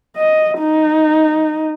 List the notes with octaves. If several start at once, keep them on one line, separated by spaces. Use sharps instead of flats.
D#5
D#4